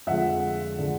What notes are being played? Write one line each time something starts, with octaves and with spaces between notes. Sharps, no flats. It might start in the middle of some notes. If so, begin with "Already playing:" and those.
F2 D3 F3 G#3 E5 F#5
D3 F3 G#3